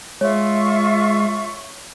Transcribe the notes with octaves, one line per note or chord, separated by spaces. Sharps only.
G#3 F4 C#5 E5 C#6